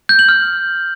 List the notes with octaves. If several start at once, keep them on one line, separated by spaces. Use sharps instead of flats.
G6
F#7
F6